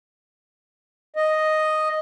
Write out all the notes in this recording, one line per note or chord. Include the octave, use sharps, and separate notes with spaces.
D#5